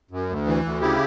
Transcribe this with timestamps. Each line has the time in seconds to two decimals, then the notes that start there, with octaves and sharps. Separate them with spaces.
0.11 F#2
0.29 D2
0.47 E3
0.65 D2
0.81 C#3 E4 G4